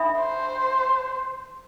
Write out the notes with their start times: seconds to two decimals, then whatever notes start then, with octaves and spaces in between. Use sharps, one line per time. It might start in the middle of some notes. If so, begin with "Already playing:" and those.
Already playing: D4 A4 E5 B5
0.18 C5